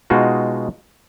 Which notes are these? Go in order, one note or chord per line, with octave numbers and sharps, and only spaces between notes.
B2 G#3 D#4 F4 F#4